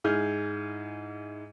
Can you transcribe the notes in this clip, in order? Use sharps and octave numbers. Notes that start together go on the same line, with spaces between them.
G#2 E4 G#4 F6 G6